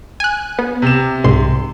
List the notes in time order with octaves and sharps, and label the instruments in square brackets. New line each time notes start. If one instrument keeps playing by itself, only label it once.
[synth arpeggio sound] G#5 F#6
B3
[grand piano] C3 E7
[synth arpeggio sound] C2 G#2 C6